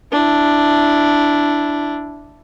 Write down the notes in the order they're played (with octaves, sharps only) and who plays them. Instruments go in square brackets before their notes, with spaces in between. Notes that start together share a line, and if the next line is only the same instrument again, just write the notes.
[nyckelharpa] D4 E4